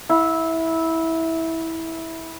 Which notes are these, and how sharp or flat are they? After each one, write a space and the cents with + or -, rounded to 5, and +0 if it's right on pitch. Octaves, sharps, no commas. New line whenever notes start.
E4 -15 F5 +45